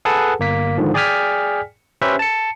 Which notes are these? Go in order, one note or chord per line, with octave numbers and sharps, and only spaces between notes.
G#4 A4 B4 F#5 A5
G1 A#3 B6
G#2 D3 D#3 F3
G#4 D5 G5 G#5 F6 B6
C#4 G4 B4 C5 E5
A5 C#7